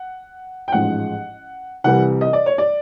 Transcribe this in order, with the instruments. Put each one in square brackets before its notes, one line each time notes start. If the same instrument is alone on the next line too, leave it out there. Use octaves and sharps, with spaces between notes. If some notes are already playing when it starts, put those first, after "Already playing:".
Already playing: [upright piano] F#5
G5
A1 G#2 F3 G#3 F#5
C2 C3 E3 G3 F#5
D#5
D5
C#5
D5